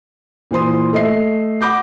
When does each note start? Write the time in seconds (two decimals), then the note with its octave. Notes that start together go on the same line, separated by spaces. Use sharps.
0.51 A#2 E3 C5 C6 D#6
0.93 A3 D#5 E5 C7
1.61 F#5 B5 D6 G6 A#6